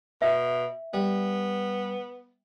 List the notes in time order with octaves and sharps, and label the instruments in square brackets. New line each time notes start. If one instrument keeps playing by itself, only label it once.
[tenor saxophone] B2 [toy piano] E5
[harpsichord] G3 [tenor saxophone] B3